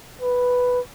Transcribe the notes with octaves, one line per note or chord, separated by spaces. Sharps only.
B4